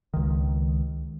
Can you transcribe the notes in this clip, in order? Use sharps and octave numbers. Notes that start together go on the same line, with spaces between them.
C#2 D#3